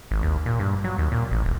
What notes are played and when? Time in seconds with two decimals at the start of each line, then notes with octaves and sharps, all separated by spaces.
0.11 G#1
0.23 D#2
0.46 A#2
0.59 G2
0.84 F#3
0.98 D#2
1.12 A#2
1.31 A1
1.45 D#1